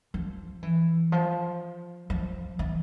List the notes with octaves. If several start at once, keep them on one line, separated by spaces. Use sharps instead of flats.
F3
E3
F3
F3
E3